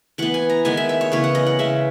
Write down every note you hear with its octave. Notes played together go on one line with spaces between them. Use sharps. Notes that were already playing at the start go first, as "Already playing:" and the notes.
E3 B3 F#5
G#5
A#5
D#3 G#3 B3 G#5
E5
E5
C#5
C#3 E3 B3 C#5
F#5
D#5
F#5
C#3 G#3 B3 E5